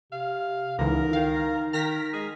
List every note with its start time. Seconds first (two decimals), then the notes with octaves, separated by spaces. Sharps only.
0.12 C3 F5
0.79 C#2 D3 E3 D#4 A#4
1.13 D#3 F5
1.73 D#3 A#4 F6 A#6 B6
2.13 G#3 G#4